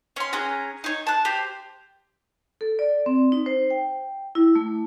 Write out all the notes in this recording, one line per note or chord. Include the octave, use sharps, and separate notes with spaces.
C#4 C6
C#4 G#4 A#5 F#6
D#4 C#5
A5 F#6
G4 C5
A4
D5
C4
D#4
C5
G5
E4
A3